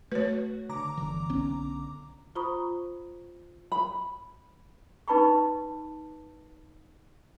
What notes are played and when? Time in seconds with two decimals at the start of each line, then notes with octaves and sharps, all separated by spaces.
0.12 A3 F#4 B4 C#5
0.69 D3 A#5 D6
0.97 G1 E3
1.29 B1 B3 C#4
2.35 F4 C5 A#5 B5 C#6 D#6
3.72 B5
5.08 D#4 B4 A5 B5 C#6